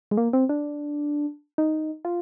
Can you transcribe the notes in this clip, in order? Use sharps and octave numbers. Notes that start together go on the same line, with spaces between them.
G#3
A#3
C4
D4
D#4
F4